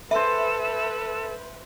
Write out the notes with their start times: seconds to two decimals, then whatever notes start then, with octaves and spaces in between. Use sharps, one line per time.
0.11 A4 B4 C5 E5 B5